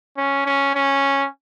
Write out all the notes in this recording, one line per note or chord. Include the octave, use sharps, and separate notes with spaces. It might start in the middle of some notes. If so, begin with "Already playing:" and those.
C#4
C#4
C#4